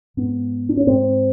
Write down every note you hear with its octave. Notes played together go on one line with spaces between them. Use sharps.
G#2 B3
D4
C#4
G#2 C4